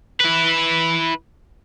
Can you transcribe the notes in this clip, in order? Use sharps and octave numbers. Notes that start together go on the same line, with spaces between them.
E4 B4